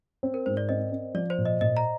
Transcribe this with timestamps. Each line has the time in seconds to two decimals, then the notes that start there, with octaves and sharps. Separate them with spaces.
0.23 C4
0.34 A#4
0.46 G#2 C5
0.57 D5
0.69 C4 D#5
0.92 C4
1.14 F3 D5
1.30 C5
1.38 A#2
1.45 D#5
1.61 A#2 D#5
1.77 A#5